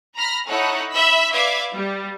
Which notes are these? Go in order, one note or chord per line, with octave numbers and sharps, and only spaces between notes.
A#5 B5 F6 A#6
D#4 E4 A4 C#5 F#5
E5 B5 E6
B4 D5 E5 F5 D6 G#6
G3